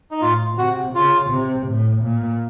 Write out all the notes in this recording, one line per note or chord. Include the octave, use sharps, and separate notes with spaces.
D#4
A2 F4
C3 F#4
C#3 F4
C3
A2
A#2